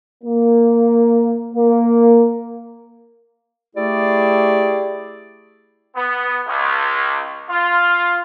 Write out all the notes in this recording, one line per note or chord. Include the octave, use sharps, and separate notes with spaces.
A#3
A#3
A3 E4 G4 G#4 D5
B3
C#2
F4